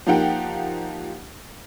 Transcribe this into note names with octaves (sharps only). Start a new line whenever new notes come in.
F3 A#3 D#4 G4 F#5 G5